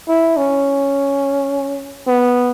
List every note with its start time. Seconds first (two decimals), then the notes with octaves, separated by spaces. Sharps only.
0.09 E4
0.37 C#4
2.07 B3